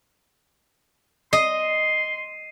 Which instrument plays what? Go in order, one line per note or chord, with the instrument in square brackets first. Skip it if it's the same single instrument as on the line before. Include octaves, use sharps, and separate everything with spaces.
[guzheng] D#5 [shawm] C6 [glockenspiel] C7 D#7